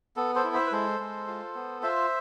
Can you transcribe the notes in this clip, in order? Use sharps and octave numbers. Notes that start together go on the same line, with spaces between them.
B3 A4
A4 C5
E4
C5 E5
B4
G#3 A4 C5
G#3
F4
B3
F4 C5 E5